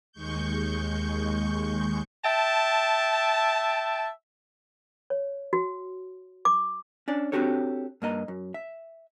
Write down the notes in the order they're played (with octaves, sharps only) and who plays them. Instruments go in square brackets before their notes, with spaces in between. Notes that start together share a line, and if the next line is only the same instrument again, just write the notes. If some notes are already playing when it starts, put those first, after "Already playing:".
[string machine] D#2 G#3 C#6 G6
[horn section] E5 G5 A5
[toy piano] C#5
F#4
D6
[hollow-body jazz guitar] C#4 D4 D5
C4 D4 F#4 G4 A4 C#5
G2 A#3 D#5 A#5
F#2
E5